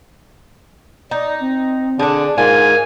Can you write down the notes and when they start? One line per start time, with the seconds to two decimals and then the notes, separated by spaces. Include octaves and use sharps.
1.11 D#4 D5
1.40 C4
1.99 D3 D4 G#4
2.38 G#2 F4 A#4 G#5